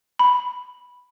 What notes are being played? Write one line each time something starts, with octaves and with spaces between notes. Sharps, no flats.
B5